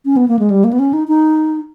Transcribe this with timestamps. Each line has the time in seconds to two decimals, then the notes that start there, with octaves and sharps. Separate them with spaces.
0.05 C#4
0.17 B3
0.28 A#3
0.39 G#3
0.50 G3
0.64 A#3
0.73 B3
0.79 C#4
0.93 D#4
1.08 D#4